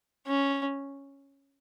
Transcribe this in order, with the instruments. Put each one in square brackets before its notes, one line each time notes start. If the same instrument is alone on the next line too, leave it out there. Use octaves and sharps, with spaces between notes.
[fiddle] C#4